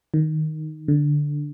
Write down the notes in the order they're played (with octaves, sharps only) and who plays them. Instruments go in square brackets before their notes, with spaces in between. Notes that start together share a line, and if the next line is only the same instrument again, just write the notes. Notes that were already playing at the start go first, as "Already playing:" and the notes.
[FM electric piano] D#3
D3